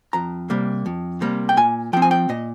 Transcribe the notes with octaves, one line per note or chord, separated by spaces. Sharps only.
F2 A#5
C3 G3 A#3
F2
C3 G3 A#3
G5
A#2 G#5
F3 C4 G5
G#5
G5
A#2 D#5